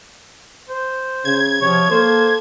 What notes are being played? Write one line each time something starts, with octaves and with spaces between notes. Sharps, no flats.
C5
C#3 G#6
C3 F3 C#5
A#3 A4 C5